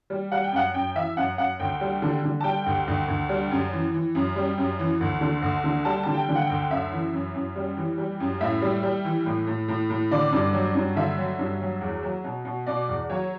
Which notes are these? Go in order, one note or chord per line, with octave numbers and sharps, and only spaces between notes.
G3
G3 F#5
G5
F#2 F#5
F#2 G5
E3 E5
F#2 F#5
F#2 F#5
D2 G5
G3
D3
D3
A5
G3 G5
D2
D2
D2
G3
F#2
E3
E3
F#2
G3
F#2
E3
D2
D3
D2
D3
G3 A5
D3 A5
G5
D3
F#5
G5
D2
F#2 E5
E3
F#2
F#2
G3
E3
G3
F#2
A2 E5
G3
G3
E3
A2
A2
A2
A2
D3 D5
G2
F#3
G2
D3 E5
F#3
G2
F#3
E2
F#3
B2
B2
B2 D5
E2
F#3 C#5